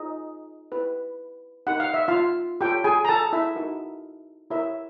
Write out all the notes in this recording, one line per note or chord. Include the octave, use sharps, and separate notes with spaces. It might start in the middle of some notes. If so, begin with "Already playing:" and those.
Already playing: D#4 F4 G#4 C5 D#5
E4 G4 B4
D#4 G4 A#4 F#5
F5
E5
F4 F5
F4 G4 A4 C#5 G5
G#4 G#5
A#5
A4 A5
E4 E5
D#4 F#4 A#4
E4 G4 A#4 C#5 E5